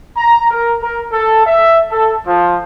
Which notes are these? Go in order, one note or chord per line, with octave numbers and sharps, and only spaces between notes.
A#5
A#4
A#4
A4
E5
A4
F3